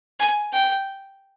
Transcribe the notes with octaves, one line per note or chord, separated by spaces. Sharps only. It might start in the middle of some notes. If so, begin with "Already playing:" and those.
G#5
G5